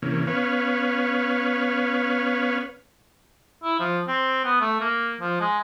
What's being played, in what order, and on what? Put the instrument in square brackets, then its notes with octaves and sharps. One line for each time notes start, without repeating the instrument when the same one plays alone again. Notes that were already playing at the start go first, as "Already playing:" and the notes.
[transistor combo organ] C3 E3 A#3 C#4
B3 C#4 B4 C#5 F5
[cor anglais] E4
F3
C4
B3
A3
A#3
F3
G#3